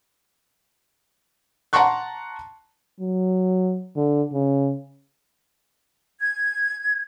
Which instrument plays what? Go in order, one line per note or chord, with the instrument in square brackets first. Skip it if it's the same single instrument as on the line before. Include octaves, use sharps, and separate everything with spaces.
[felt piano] F#5 A5 A#5 C6 C#6 F#6
[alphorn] F#3
D3
C#3
[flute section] G#6